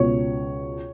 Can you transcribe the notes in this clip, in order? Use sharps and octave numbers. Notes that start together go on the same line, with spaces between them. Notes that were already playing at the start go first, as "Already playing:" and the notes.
Already playing: C#2 B2 C#5